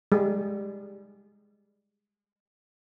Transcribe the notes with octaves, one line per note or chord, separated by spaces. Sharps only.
G3 G#3